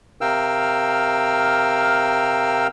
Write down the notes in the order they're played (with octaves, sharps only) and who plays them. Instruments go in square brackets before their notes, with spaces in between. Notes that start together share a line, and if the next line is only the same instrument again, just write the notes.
[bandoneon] C3 A#4 F5 G5 E6 F6